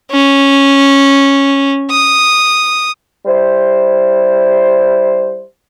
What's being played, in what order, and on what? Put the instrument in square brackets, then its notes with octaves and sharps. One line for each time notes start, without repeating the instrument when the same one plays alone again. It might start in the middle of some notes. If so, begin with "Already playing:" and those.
[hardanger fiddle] C#4
D#6
[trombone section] G3 E4 C5